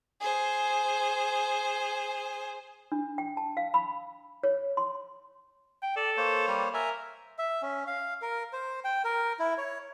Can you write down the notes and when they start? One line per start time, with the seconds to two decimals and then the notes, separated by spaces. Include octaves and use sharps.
0.20 G#4 C5
2.92 D4
3.18 G5
3.37 A5
3.57 F5
3.74 B5
4.44 C#5
4.77 C6
5.82 G5
5.96 A4 D5
6.17 A#3 C5 C#5
6.48 G3
6.74 A#4 E5 G#5
7.38 E5
7.62 C#4
7.87 F5
8.22 A#4
8.53 C5
8.84 G5
9.05 A#4
9.39 E4
9.58 C#5